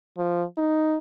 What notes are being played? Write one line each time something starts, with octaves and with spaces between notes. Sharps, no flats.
F3
D#4